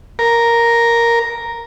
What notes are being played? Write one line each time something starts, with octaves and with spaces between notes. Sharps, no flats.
A#4